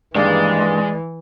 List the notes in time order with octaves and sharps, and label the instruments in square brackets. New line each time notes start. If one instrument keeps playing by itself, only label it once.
[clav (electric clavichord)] G2 D#3 A#3 [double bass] E3 [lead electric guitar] G#3 [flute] D5